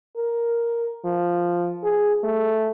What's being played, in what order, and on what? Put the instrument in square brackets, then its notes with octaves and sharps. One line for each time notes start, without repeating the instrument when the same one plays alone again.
[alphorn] A#4
F3
G#4
A3